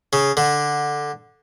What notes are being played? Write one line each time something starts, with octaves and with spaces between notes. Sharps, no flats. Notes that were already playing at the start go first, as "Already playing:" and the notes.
C#3
D3